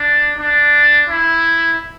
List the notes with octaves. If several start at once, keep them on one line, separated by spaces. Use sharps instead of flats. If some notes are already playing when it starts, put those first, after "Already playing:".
Already playing: D4
D4
E4